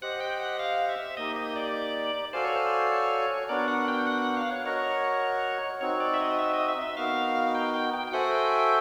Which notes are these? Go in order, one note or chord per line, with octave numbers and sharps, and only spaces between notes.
G4 C5 D#5 F#5
G5
F#5
F5
E5
A#3 D#4 G4 D#5
D#5
D5
F#4 A4 C5 D5 F5 G#5
C#5
C5
C#5
B3 D4 F#4 A#4 D5
F#5
G5
F#5
F#5
F5
C#5
F#4 A#4 C#5 D#5 F#5
C4 D#4 F#4 C#5
D5
E5
D#5
E5
D#5
E5
E5
B3 D#4 F#4 A#4 F5
G5
G5
G5
G5
F#4 A4 C5 E5 F#5 G#5
G5
G5